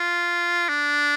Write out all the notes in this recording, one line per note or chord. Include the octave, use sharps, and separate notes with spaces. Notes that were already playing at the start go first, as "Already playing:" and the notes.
Already playing: F4
D4